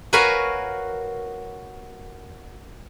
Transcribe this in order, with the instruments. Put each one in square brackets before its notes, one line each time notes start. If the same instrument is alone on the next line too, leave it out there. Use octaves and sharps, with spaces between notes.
[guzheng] F#4 A#4 B4 C#5 F5 G#5